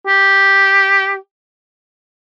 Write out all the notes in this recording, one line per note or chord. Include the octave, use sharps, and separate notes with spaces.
G4